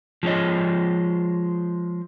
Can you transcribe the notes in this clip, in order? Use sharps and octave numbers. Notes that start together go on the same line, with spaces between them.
F3 G#3 C4 C#5 D#5